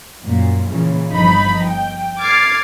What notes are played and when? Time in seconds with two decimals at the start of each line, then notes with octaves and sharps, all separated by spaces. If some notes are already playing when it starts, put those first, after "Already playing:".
0.21 F#2 A#2
0.68 A#2 C#3 E3
1.11 G1 F3 D#4 B5
1.65 G5
2.19 D6 F6 G#6 A6 C7